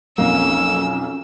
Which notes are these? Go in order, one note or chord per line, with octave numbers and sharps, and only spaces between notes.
B1 F2 A#3 C#4 E6